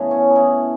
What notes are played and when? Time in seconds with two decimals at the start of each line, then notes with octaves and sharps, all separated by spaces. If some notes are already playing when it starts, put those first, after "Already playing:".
Already playing: F#2 C#3 E3 A3 B3
0.11 C#4
0.30 D#4
0.36 E4